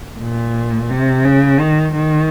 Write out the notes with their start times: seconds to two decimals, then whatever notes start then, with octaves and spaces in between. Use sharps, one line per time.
0.20 A#2
0.90 C3
1.24 C#3
1.60 D#3
1.95 D#3